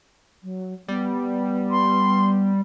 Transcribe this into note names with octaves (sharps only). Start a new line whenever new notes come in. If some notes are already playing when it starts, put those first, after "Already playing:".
F#3
G3 B3
C6